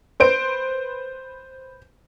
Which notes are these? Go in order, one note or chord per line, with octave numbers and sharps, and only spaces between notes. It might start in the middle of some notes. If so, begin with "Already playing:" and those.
B4 C5 D7